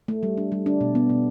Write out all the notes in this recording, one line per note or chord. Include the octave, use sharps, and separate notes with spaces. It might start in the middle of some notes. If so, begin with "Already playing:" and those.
A3
G3
D4
G3
D4
B2
B3
B2